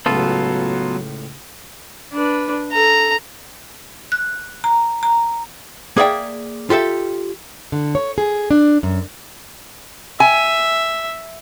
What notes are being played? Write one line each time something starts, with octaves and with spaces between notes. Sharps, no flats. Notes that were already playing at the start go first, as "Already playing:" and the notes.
C#2 A2 F#3 B3 F4 A4
D4 B4
A4 A#5
F#6
A#5
A#5
A#3 G#4 D5 E5 G5
F4 G4 A4 E5
D3
C#5
G#4
D4
F#2
E5 G#5